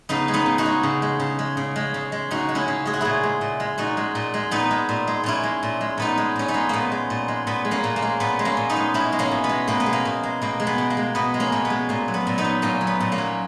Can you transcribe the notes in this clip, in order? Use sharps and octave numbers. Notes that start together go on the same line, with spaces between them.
C#3 B3 D#4
G#3
B3 D#4
C#3
D#4 F#4
G#3
C#3
G#3
C#3
G#3
C#3
G#3
C#3
G#3
C#3 D#4 F#4
G#3
C#4 E4
C#3
G#3 G#4
F#4
A#2 E4 G#4
G#3
A#2
G#3
A#2 D#4 F#4
G#3
A#2
G#3
A#2 B3 D#4
G#3
A#2
G#3
A#2 C#4 E4
G#3
A#2
G#3
A#2 B3 D#4
G#3
A#2 C#4
B3 D#4
G#3
A#2 A#3 B3
G#3
A#2
G#3
A#2 B3
G#3
A#3 C#4
A#2
A#3
G#3
A#2 B3
G#3
A#3 C#4
A#2
B3 D#4
G#3
B2 C#4 E4
G#3
A#3 C#4
B2
B3
G#3
B2 A#3
B3
G#3
A#3
B2
G#3
B2 A#3
G#3
B3
B2
A#3
G#3
B2 B3
G#3
A#3 C#4
B2
B3
G#3
A#2 A#3
F#3
B3
A#2
B3 D#4
F#3
A#2 A#3 C#4
F#3
B3
A#2
A#3 C#4
F#3